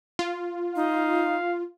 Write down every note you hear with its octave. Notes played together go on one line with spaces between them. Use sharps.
F4
D#4 F5